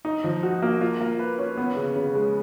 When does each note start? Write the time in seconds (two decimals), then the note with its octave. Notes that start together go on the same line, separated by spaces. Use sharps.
0.05 D#4
0.24 F3
0.43 F#4
0.62 A#3
0.81 F4
1.00 A#3
1.19 B4
1.38 C#4
1.58 B3
1.76 C#3
1.96 C#3
2.15 G#3